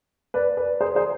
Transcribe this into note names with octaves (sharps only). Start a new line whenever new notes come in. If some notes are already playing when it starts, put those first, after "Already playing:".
B4 D5
B4 D5
G#4 C5
G#4 C5